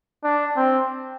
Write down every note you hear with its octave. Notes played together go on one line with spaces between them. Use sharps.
D4
C4